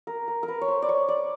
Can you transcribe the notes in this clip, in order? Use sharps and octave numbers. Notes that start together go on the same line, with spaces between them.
A#4
A#4
A#4
B4
C#5
C5
D5
C#5
D5